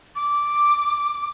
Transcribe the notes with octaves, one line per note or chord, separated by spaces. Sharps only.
D6